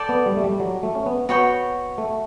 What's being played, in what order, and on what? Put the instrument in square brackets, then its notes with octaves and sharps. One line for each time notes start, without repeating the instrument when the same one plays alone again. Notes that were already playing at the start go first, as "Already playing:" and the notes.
Already playing: [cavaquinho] A4 D5 G5
[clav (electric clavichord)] B3
G3
A3
G3
F#3
A3
C#4
B3
[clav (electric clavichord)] B3 [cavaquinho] F#4 C#5 G5 B5
[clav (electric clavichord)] A3